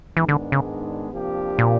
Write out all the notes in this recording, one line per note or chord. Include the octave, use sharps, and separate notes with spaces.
G#2 D#3 E3 G#3 B3 D4
D3
C#3
C3 F3 A#3 D4 G4
A#2